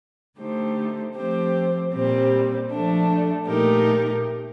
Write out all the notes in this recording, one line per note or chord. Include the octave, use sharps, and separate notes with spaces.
D3 A3 D#4 G4 C5
F3 A3 C4 G4 C5
A#2 G3 C4 G4
F3 A3 D4
A#2 A3 D#4 G4 A#4